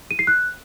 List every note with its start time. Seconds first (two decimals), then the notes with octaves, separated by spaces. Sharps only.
0.11 D#7
0.19 C7
0.27 F#6